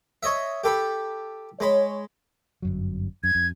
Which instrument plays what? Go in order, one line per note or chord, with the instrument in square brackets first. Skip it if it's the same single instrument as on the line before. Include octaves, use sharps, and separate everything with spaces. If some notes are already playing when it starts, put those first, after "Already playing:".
[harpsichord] C#5 D#5 E5
G4 A4 B5
[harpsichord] G#3 B5 [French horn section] C#5
[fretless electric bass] G1 F#2 F#3
[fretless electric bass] F#2 [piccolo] G#6
[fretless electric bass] F2